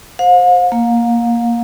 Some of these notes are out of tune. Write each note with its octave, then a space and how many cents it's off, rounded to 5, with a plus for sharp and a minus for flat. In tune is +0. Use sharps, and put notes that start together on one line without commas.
C5 +0 F5 +45
A#3 +0 F5 +35